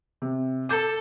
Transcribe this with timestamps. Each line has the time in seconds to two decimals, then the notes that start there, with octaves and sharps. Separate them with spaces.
0.22 C3
0.69 A4 D6 G6